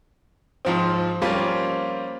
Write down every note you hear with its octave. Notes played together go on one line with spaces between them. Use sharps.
G#2 F3 C4
F3 G3 A#3 C4 C#4 F4